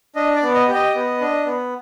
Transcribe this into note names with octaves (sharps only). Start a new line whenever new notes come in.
D4 D#5
D5
B3
D#5
G4
D#5
B3
D4
B3